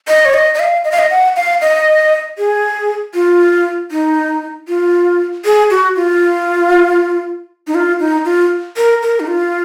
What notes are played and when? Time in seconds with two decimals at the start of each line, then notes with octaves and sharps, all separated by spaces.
0.08 D#5
0.25 C#5
0.34 D#5
0.54 D#5
0.60 F5
0.85 D#5
0.92 F5
0.99 D#5
1.10 F#5
1.36 F5
1.61 D#5
2.38 G#4
3.14 F4
3.91 D#4
4.68 F4
5.45 G#4
5.70 F#4
5.96 F4
7.67 D#4
7.75 F4
8.00 D#4
8.25 F4
8.77 A#4
9.02 A#4
9.20 D#4
9.27 F4